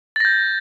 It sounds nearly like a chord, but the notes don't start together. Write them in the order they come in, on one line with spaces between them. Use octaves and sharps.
A6 A#6 G6